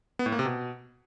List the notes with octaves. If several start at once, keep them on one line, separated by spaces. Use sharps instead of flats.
B3
A2
A#3
C3
B2